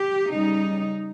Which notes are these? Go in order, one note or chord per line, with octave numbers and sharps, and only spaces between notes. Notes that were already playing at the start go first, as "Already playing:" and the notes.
Already playing: G4
C#3 G3 D#4